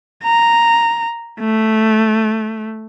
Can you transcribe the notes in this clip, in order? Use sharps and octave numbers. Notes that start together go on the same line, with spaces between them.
A#5
A3